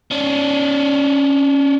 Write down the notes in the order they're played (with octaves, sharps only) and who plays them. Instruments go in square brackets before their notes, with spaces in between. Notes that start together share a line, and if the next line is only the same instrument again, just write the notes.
[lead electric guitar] C#4 D4